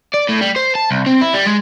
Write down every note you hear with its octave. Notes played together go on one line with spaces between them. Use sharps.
D5
A2
G3
C5
A5
C2
C4
E4
G3
G#3